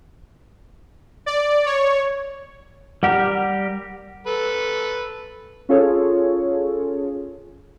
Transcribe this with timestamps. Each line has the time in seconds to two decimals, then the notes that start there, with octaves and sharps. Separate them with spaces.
1.26 D5
1.66 C#5
3.03 G3 G4 A#4 F#5
4.26 A4 B4
5.69 C#4 F4 G#4 A4 C#5